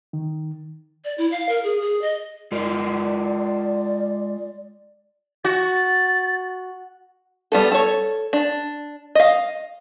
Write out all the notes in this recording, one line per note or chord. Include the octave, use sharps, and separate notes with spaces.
D#3
D5
E4
F5
A#4
G#4
G#4
D#5
G#3 F4 A#4 D5
F#4 A6
G3 B3 A4
A4 C#5
D4
D#5 F5